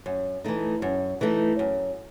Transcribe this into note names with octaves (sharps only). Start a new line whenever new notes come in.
F#2
E3 A3 D#4
F#2
E3 A3 D#4
F#2